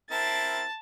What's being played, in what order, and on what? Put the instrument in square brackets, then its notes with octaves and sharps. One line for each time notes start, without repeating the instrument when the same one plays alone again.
[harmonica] C4 E4 A#4 [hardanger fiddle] A5 [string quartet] A6